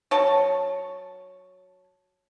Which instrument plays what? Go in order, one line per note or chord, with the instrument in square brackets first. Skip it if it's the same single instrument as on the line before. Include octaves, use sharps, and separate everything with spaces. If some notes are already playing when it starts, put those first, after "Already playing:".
[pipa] F#3 C#5 A5